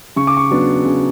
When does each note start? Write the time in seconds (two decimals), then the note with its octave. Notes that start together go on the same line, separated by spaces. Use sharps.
0.16 C#3 C#6
0.27 D6
0.37 C#6
0.51 F#3 B3 D4
0.85 C#3